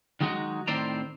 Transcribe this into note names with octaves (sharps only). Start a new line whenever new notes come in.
D#3 F#3 G#3 D#4 F#4
A2 D#3 C4 C5 D5 A#5